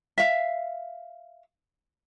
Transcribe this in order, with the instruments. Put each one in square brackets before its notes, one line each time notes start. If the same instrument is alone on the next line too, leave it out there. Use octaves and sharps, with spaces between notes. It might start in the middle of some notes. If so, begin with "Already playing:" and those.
[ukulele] E5 F5